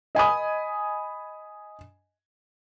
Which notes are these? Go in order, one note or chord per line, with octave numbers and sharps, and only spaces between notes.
D#5 G#5 B5 D#6